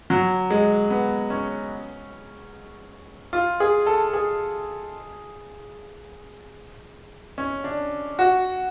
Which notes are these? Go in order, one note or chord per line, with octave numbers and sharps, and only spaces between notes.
F#3
G#3
B3
C#4
F4
G#4
A4
G#4
C#4
D4
F#4